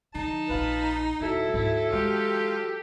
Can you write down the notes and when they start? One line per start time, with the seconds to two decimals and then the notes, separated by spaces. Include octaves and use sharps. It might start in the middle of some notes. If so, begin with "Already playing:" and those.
0.15 D3 F3 D#4 A5
0.49 A#1 C#4 F4 B4
1.21 D#1 F#3 E4 A4
1.54 D2 G#2 E4
1.92 E3 G#3 F4 G4